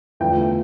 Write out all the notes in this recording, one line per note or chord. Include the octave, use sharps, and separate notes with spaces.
E2 D3 F3 A3 G5